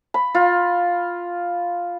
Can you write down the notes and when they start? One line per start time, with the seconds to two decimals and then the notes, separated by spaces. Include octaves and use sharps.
0.14 B5
0.35 F4